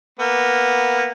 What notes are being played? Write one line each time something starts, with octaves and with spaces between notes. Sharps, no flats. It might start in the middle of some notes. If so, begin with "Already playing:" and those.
A#3 B3